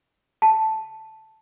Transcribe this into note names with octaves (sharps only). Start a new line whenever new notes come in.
A5